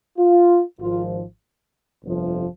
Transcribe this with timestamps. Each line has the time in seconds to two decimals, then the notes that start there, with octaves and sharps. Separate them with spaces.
0.18 F4
0.80 G#1 G#2 F3 F4
2.03 G1 F2 C3 F3